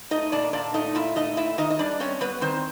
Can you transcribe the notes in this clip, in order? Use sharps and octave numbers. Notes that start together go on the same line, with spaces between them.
A3 D#4 D#5
A#2 D4 D5
A#2 D4 D5
A3 D#4 D#5
A#2 E4 E5
A3 D#4 D#5
A#2 E4 E5
D#3 D#4 D#5
D#5
G3 D4 D5
C4 C#4 C#5
G3 B3 B4
D#3 C4 C5